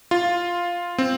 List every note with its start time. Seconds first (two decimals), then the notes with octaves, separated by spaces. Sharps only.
0.11 F4
0.98 C4